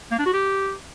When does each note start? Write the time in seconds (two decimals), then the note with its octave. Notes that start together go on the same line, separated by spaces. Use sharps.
0.11 A#3
0.19 D4
0.26 F#4
0.33 G4